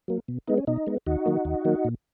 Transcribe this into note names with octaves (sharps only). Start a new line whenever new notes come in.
F#3 A#3
B2
G#3 B3 D#4
C#4
B2 D#4
G#3 B3
D#2 D#4 F#4
D#3 F#3 A#3
D#2
D#3 F#3 A#3
A#2